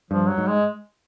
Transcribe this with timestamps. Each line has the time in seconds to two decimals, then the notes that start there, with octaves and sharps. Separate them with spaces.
0.11 G2 F3
0.29 F#3
0.38 G#2
0.48 G#3